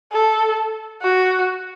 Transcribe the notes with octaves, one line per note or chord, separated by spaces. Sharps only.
A4
F#4